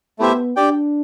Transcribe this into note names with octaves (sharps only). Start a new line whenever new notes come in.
A3 B3 E4 G4 C5 E5
D4 G4 D5 G5